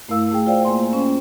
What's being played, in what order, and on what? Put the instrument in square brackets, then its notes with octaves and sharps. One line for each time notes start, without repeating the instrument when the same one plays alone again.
[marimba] G2 A3 E4 A#4 F5 E6
A3 G#4 G5
F4 C5 D5 F5 G5
A#3 C5 G#5 C6
C#4